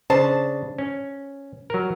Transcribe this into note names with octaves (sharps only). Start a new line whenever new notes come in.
C#3 D4 C5 A5
C#4
F#3 A#4